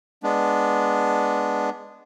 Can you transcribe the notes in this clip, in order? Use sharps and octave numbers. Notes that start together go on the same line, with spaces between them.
G#3 B3 D4